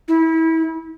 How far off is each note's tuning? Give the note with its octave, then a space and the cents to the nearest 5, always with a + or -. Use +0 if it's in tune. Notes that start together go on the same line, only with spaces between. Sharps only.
E4 -25